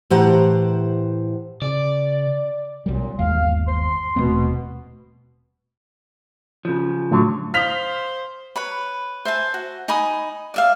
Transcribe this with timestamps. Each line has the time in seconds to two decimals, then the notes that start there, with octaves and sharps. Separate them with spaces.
0.10 A2 E3 G4 C5 F#5 A#5
1.62 C#3 D5
2.86 B1 F#2 A#2 G3
3.19 G1 D#2 G#3 F5
3.68 C6
4.16 D#1 B2 A3 C4
6.65 C#3 F3
7.11 A2 D3 F#3
7.54 C5 F5 D#6 F6 B6 F7
8.56 B4 C#5 B5
9.25 C5 E5 G#5 A5
9.54 F#4
9.88 D#4 G#5 B5 D#6
10.54 D5 E5 F5